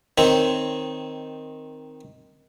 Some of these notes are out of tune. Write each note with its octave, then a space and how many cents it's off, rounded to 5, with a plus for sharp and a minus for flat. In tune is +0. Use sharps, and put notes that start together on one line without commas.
D#3 +0 C4 +0 C#5 +0